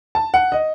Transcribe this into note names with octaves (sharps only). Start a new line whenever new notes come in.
A5
F#5
D#5